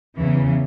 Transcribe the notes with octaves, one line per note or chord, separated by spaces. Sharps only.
E2 C#3 E3